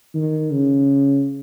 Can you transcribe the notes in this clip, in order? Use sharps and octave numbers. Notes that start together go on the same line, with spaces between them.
D#3
C#3